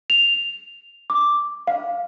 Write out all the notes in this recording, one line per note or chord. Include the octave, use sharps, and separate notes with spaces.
F7
D6
F5